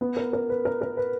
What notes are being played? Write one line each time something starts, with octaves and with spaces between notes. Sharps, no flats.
B3
A#4
A#4
B4
A#4
A#4
B4